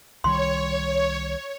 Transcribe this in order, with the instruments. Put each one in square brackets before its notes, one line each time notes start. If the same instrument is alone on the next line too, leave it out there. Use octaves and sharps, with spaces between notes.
[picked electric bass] C2 D#3 G3 [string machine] C#5 [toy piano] C6